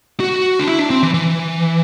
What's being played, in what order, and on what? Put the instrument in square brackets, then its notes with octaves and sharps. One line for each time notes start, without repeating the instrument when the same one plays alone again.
[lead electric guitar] F#4
D4
E4
D4
C4
E3
E3